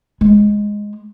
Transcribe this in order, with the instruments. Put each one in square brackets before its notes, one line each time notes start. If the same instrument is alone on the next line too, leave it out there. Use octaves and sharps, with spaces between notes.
[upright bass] G#3